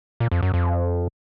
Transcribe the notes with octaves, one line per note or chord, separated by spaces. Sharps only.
A#2
F2
F#2
F2